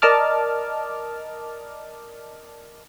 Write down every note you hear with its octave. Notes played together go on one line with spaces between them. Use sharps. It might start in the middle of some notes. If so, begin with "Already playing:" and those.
A#4 D5 D#5 A5 D6 F6